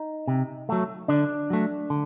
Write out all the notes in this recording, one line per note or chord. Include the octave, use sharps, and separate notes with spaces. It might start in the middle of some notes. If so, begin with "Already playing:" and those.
Already playing: D#4
C3
F#3 A3
D3 D4
F#3 A3
D3